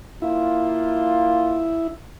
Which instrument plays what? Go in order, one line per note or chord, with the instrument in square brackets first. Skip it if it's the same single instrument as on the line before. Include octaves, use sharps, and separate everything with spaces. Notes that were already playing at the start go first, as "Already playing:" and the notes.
[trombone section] A#3 F4 [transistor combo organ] E4